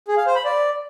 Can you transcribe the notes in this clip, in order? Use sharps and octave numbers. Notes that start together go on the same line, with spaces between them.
G#4
F5
C5
B5
D5